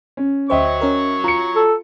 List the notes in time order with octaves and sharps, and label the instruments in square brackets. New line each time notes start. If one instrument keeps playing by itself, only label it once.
[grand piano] C#4
[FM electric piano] D2 C5 [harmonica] F#3 C#6 [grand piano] D#5 E5 G5
[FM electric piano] C#4 A#4
[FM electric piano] F4 [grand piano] A#5 C#7
[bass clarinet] A4